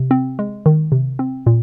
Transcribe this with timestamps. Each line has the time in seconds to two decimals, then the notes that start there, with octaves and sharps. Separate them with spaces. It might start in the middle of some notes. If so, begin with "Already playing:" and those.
Already playing: C3
0.11 C4
0.39 G#3
0.66 D#3
0.92 C3
1.19 C4
1.46 A#2